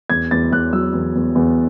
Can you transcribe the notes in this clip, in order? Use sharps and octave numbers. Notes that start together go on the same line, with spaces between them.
E2 G#6
E2 A6
E2 F#6
F#3 E6
E2
E2
E2